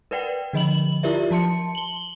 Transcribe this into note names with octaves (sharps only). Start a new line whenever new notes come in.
A#4 B4 D5 F#5 G5
D3 F3 D#5 B5 F#7
E4 F4 G4 A#4 D5 E5
F3 A5 C6 C#7
F#7 G7